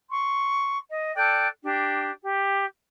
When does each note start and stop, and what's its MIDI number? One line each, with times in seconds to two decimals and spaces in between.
0.09 0.77 84
0.09 0.77 85
0.89 1.11 75
1.16 1.46 69
1.16 1.46 74
1.16 1.46 79
1.16 1.46 90
1.63 2.11 62
1.63 2.11 67
2.21 2.63 67